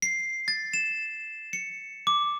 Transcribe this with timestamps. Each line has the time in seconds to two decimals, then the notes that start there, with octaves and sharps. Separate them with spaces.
0.02 C7
0.48 A6
0.74 E7
1.53 C#7
2.07 D6